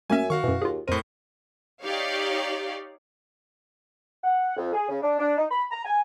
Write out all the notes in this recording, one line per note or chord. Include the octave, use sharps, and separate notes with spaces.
F#2 A3 A#3 C#4 E5 G#5
D#3 F#4 F5 C#6
F#2 B2 E3
D#2 F4 G#4
F2 A2 A#4 C5 D#7
D#4 G4 C#5 D5 F5
F#5
F2
G#4
C#3
D4
D4
D#4
B5
A#5
G#5